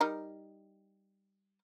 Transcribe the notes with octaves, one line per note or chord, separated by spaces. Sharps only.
G3 D#4 A#4